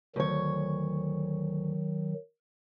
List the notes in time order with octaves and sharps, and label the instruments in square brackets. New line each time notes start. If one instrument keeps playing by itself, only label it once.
[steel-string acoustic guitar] D2 C#5 [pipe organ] D#3 F#3